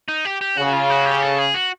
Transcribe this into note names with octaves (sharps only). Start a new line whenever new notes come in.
D#4
G4
G4
C#3 F#4
F4
F#4
G4
A4
G#4
F#4